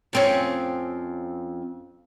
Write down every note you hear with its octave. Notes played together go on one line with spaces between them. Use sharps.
F2 C4 C#4